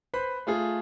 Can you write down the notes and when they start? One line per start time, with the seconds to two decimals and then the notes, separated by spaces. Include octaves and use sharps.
0.14 B4 C5 B5
0.47 A3 F4 G#4